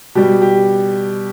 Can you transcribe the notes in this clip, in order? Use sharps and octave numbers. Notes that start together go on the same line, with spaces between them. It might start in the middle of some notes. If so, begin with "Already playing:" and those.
B2 G3 G4
G4